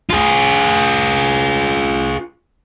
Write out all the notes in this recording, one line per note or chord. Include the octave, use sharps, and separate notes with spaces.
F4 G#4